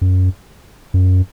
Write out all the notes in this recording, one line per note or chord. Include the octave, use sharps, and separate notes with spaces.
F#2
F#2